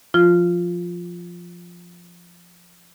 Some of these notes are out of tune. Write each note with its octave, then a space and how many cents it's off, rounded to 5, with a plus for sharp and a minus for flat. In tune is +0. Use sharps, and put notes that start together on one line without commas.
F3 +0 F4 +0